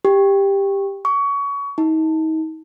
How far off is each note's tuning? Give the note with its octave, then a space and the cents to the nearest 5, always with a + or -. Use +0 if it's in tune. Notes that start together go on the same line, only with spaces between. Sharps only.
G4 +10
C#6 +25
D#4 +35